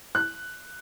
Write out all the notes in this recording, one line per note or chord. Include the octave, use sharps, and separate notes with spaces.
F#6